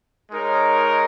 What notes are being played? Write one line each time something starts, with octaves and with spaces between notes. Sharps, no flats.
G#3 D#4 A#4 C#5